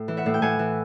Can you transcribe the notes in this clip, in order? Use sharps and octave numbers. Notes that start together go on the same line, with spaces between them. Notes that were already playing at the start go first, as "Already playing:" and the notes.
Already playing: A2
E3
E5 F#5
A2
G5
A2 F#5 G#5
E3